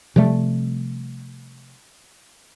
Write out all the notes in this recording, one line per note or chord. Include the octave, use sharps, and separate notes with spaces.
C3 F3 G3 A3